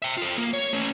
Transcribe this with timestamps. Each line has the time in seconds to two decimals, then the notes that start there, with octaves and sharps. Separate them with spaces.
0.02 E5 G5
0.17 F4 A4
0.38 A#3
0.53 C#5
0.73 A3 C#4